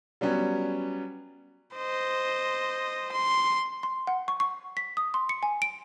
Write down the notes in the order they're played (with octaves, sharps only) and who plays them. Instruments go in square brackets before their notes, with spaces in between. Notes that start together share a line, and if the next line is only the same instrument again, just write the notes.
[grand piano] F#3 G3 B3 C#4
[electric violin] C5 D#5
C6
[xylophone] C6
F#5
C#6
C#6
B6
D#6
C6
C#7
G#5
D7